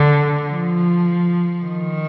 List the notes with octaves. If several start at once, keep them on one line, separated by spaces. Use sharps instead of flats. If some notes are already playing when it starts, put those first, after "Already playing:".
Already playing: D3
F3
D#3